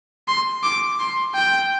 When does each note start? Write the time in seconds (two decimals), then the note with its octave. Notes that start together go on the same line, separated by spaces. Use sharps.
0.28 C6
0.63 D6
0.99 C6
1.34 G5